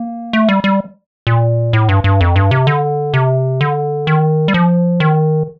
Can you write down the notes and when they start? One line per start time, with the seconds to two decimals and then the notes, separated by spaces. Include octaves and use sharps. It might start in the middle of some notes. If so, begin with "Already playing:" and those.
Already playing: A#3
0.33 A3
0.49 G3
0.64 G3
1.27 A#2
1.73 A2
1.89 G2
2.04 G2
2.21 F2
2.36 G2
2.51 C3
2.67 D3
3.14 C3
3.61 D3
4.07 D#3
4.48 G3
4.54 F3
5.00 D#3